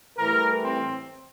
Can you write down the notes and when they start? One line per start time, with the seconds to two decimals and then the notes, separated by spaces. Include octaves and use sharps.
0.17 A2 E3 G3 A#4
0.62 C4